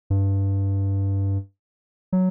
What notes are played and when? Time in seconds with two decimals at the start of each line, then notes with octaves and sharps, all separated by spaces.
0.10 G2
2.13 F#3